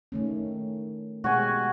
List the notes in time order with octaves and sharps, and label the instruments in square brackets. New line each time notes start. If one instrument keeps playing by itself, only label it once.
[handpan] D#3 A3 C#4
[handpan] B2 G#3 G4 [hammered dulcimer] F#4 G#5